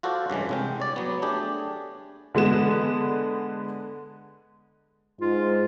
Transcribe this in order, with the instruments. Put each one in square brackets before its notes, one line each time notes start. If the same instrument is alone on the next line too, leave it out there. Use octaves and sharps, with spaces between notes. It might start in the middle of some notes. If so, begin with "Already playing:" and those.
[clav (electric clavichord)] F4 F#4 A4 C5 D5
G2 C#3 E3 G#3
C2 G#3 G5
C#5 D5
F#3 B3
A3 D4 G4 G#4
[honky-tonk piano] D3 G#3 B3 E7
[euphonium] G#2 [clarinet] F4